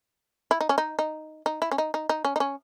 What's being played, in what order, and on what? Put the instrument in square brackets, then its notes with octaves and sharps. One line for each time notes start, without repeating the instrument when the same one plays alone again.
[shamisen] E4
D#4
C#4
D#4
D#4
D#4
E4
C#4
D#4
D#4
D#4
C#4
D#4
C#4